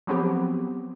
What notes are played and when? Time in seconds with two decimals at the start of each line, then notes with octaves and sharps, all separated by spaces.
0.07 F3 F#3 B3 C4 G4